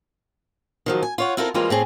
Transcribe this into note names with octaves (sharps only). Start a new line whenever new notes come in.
D#3 F3 F#3
G#5
F4 C#5 F#5
C4 E4 F4 A4 A#4 C5
E3 G3 G#3 A#3 C4 F4
A2 C4 G#4